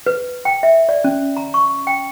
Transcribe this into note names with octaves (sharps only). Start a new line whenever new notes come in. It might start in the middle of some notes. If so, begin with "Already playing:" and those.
B4
G5
E5
D5
C#4
A#5
C#6
G5